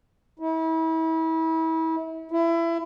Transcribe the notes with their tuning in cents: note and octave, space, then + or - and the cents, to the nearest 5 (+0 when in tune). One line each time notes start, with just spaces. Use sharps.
E4 -35
E4 +25